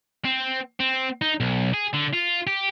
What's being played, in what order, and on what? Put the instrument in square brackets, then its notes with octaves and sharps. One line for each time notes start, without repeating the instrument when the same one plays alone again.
[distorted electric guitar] C4
C4
D#4
B1
G#4
D3
F4
G4